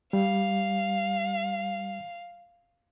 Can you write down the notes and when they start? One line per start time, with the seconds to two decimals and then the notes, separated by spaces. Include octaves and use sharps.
0.13 G3 F5